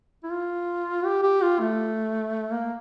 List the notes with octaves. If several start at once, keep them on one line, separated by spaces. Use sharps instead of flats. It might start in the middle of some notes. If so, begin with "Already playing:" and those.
E4
F4
G4
G4
F4
A3
A#3